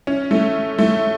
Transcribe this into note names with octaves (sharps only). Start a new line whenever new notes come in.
C#4
A3
A3